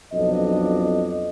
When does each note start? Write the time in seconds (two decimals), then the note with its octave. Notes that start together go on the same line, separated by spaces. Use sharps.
0.13 B1 F2 D4 D#5